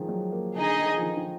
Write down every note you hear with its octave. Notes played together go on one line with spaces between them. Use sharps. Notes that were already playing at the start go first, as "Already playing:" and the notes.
Already playing: D#3 F3 G#3
F#3
A#3
D3 D#4 G#4 D#5
D#3
F3
D#3
D#3